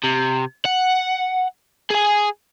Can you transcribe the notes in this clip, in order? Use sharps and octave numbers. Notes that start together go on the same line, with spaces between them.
C3
F#5
G#4 G#5